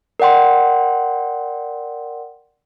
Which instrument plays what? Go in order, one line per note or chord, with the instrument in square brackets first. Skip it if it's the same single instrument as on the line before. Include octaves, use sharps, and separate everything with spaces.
[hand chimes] A#4 D5 F#5 G5 C6